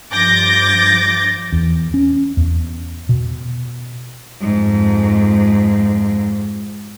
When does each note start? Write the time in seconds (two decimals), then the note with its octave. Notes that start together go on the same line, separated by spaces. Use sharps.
0.11 G2 F3 D6 G6 A6 A#6
1.52 E2
1.94 C#4
2.37 E2
3.09 B2
4.42 F2 G#2